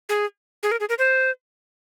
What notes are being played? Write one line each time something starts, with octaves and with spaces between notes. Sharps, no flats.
G#4
G#4
A#4
G#4
A#4
C5